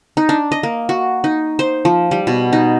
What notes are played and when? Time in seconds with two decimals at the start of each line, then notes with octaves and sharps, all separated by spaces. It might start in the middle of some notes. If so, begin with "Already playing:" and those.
0.17 D#4
0.29 D4
0.52 D#5
0.63 A#3
0.89 F#4
1.24 D#4
1.59 C5
1.85 F3
2.11 G3
2.27 B2
2.53 D#4